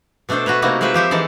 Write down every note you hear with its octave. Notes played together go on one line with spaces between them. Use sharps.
B2 A3 D4 A4 C5
F#4 A4 B4 C#5
C3 A3 A#3 D#4 E4 F#4
G#3 A#3 C4 B4 E5
F3 G4 C5 E5
E3 G#3 D#4 A4 A5